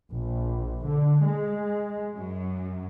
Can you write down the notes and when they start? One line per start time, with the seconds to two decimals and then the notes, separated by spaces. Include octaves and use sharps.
0.12 A#1
0.85 D3
1.26 G#3
2.17 F#2